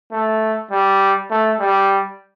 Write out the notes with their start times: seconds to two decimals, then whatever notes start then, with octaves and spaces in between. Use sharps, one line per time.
0.12 A3
0.71 G3
1.31 A3
1.60 G3